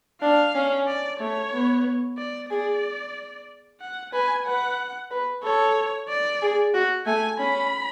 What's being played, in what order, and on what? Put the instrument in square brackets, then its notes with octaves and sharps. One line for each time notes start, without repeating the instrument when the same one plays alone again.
[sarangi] D4 [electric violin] F5
[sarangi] C#4
[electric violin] D5
[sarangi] A3 [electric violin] C#5
[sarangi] B3
[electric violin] D5
[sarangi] G#4 [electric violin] D5
[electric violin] F#5
[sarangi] B4 [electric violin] G#5
[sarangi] B4 [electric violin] F#5
[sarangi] B4
[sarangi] A4 [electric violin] C#5
[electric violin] D5
[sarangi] G#4
F#4
[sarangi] A3 [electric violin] G#5
[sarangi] C#4 [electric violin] B5